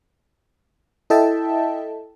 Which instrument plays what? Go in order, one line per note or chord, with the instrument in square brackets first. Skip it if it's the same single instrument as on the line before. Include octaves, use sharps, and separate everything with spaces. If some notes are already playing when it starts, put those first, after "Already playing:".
[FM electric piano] E4 A4 D#5 E5 G5 A5